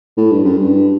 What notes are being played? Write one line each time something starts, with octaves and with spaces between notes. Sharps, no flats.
A2
G2
F#2
G2